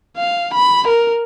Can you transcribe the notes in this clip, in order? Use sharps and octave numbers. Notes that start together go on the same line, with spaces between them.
F5
B5
A#4